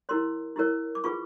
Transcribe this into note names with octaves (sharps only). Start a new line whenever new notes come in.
E4 G4 A#4 C#5 C6
E4 G4 A#4 C#5
D6
F4 G#4 B4 C#6